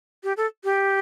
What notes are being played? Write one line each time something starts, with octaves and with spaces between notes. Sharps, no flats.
G4
A4
G4